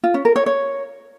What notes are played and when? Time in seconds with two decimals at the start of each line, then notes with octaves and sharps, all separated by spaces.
0.04 F4
0.14 C#4
0.25 A#4
0.36 C#5
0.46 C#5